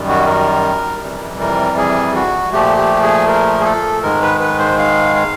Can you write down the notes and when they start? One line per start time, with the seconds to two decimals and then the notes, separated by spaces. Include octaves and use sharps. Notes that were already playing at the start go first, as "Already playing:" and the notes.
Already playing: F#2 D#3 G3
0.09 F#4
0.27 A#4
1.03 F2 C3 E3 G3
1.40 A#4
1.78 G#4
2.15 F#4
2.53 A#2 F3 A3 G4
2.77 G4
3.02 G#4
3.28 A#4
3.60 G#4
3.65 A4
4.03 G#2 D#3 G#3 A#4
4.22 B4
4.41 B4
4.59 C5
4.78 F5
5.16 F5